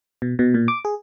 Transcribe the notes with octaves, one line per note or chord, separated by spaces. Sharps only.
B2
B2
A#2
D6
G#4